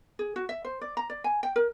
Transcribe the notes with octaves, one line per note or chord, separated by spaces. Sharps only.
G#4
F#4
E5
C5
D5
A#5
D5
G#5
G5
A#4